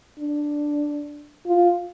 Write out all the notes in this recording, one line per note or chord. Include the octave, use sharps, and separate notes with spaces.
D4
F4